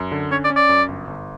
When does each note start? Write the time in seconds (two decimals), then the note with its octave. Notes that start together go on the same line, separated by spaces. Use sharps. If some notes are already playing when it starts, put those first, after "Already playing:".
Already playing: F#2
0.12 D3
0.31 C#4 C#5
0.44 D5
0.50 C#4
0.56 D5
0.69 F#2
0.88 G1
1.07 G1